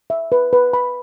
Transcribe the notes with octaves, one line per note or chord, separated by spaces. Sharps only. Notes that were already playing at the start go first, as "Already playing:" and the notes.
E5
B4
B4
B5